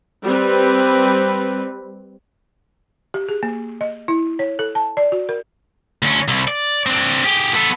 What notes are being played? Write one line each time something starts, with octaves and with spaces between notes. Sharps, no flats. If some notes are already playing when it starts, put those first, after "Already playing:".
G3 C4 B4
G4
G#4
A#3
D#5
E4
C#5
A4
A5
D5
F#4
A#4
D2 C#4
C2
D5
C4 D4
G4 G#4
B3 A4